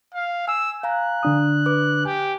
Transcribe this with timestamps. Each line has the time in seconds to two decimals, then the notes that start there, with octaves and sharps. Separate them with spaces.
0.14 F5
0.48 G#5 E6
0.83 F5 G#5 A#5 F#6
1.23 D3 D4 D#6
1.66 B4 D6
2.05 G4 G#5